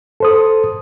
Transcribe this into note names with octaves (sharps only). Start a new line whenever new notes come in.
A4 C5 D#6